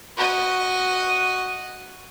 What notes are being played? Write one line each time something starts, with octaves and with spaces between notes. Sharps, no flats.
F#4 D#5